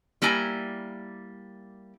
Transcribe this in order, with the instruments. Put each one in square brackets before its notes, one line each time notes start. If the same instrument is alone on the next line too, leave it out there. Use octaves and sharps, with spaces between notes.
[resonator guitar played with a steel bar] G3 A#3 E4 G#5 A#5